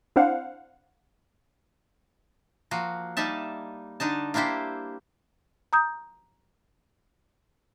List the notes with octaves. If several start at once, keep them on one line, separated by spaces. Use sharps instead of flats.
C4 D4 E4 C5 F5 F#5
F3 A#3 F#4
G3 A#3 D#4 E5 A5
D3 D4 D#4 A5
A#3 D4 E4 G4 C5
A#5 D#6 G6